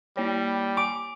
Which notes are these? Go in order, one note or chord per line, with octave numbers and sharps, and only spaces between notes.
G3 A#3 C#5
G#5 D6